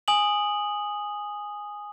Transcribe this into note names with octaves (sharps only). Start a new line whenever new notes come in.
G#5 D#6 F#7